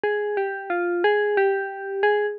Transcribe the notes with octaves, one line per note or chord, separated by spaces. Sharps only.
G#4
G4
F4
G#4
G4
G#4